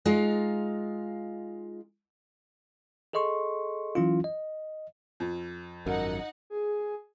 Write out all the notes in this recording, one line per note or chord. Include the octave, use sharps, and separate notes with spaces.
G#3 D#4 F4 F5
G#4 A4 D#5 C6 C#6
E3 F#3 C#4 E4 F4
D#5
F2
G#1 F#2 D#4 A#4 F#5
G#4